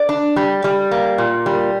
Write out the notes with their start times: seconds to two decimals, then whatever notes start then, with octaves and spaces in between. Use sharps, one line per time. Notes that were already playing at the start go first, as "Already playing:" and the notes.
Already playing: D5
0.09 D4
0.36 G3
0.64 G3
0.91 A#3
1.18 A#2
1.46 G3